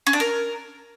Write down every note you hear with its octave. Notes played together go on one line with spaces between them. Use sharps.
C#4
D4
A#4